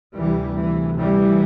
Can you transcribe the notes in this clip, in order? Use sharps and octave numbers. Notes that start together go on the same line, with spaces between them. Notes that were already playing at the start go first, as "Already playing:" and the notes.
D2 C3 E3 G3
E3
E3 G3